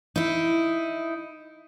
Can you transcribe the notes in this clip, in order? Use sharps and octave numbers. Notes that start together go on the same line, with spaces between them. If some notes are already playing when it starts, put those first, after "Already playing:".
D#4 E4